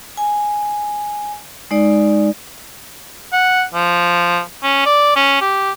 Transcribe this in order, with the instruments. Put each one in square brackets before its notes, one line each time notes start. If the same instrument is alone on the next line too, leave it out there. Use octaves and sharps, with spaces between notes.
[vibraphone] G#5
G#3 D#4 D5
[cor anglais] F#5
F3
C#4
D5
C#4
G4